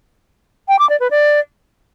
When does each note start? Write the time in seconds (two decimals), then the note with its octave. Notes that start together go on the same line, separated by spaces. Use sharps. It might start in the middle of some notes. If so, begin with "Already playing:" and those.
0.68 G5
0.79 D6
0.90 D5
1.00 B4
1.11 D5